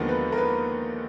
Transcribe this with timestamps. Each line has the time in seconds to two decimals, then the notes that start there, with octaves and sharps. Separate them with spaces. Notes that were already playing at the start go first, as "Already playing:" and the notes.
Already playing: D#2 D3 F3 G#3 B3 A#4
0.09 B4
0.32 A#4
0.37 B4